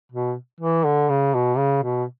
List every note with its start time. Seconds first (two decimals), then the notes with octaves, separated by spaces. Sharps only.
0.12 B2
0.60 E3
0.85 D3
1.09 C#3
1.34 B2
1.57 C#3
1.82 B2